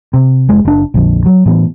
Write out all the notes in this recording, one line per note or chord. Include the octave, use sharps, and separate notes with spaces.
C3
F1 G#3
F#1 D4
A#1 F2 D3
F#3
A2 E3 B3